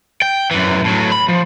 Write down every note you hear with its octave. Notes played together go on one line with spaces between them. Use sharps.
G5
F#2 E3
A2 F#3
B5
F3